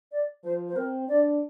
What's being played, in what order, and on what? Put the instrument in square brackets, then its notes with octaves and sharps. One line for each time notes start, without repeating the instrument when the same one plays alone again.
[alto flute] D5
[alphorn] F3 [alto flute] C5
[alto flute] C5
[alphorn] C4 [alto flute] A#4
[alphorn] D4 [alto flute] D5